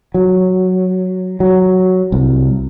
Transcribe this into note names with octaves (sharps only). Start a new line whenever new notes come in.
F#3
F#3
C2